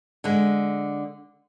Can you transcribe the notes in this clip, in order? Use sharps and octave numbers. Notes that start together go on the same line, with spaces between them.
D3 G#3